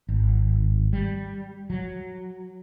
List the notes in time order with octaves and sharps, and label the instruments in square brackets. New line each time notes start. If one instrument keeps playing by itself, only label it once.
[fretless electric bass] G#1
G3
F#3